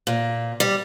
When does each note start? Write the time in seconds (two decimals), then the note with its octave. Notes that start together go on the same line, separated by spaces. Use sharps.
0.07 A#2
0.60 G3